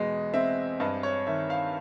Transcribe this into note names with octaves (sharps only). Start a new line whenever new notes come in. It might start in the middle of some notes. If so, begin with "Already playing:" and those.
Already playing: E2 B2 G#3 D#5
C4 E5
G2 D#5
C#5
D#3 E5
F5